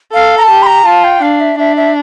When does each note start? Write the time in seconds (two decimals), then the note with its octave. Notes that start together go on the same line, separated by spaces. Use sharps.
0.13 A4 F5
0.37 A#5
0.42 A5
0.50 G4
0.62 C6
0.66 A#5
0.85 F4 A5
1.04 G5
1.22 D4 F5
1.40 E5
1.58 D4 E5
1.76 E5